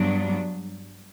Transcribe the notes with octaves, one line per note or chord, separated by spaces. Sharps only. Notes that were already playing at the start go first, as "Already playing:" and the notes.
Already playing: G2 F#3 B3 D4